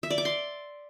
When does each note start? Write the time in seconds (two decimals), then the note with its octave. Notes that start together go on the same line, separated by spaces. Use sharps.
0.03 E5
0.10 D5
0.18 D6
0.25 C6